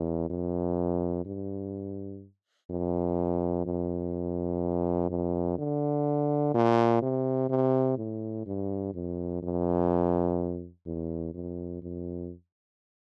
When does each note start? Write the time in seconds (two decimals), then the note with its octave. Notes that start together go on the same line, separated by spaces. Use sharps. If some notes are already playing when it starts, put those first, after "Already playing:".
Already playing: E2
0.30 F2
1.26 G2
2.70 F2
3.66 F2
5.10 F2
5.58 D3
6.54 A#2
7.02 C3
7.50 C3
7.98 A2
8.46 G2
8.94 F2
9.43 F2
10.86 E2
11.34 F2
11.82 F2